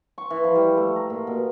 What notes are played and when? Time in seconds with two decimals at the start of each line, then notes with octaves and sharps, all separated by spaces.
0.18 C#6
0.30 E3
0.44 F3
0.55 G3
0.77 A3
0.96 A#5
1.10 A#2
1.27 B2